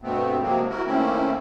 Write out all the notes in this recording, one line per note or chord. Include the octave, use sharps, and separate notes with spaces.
G2 B2 A3 B3 C4
C3 F3 F#3 G#3 A#3 C4
E4 F#4 A#4
D#3 A3 A#3 C4 C#4 E4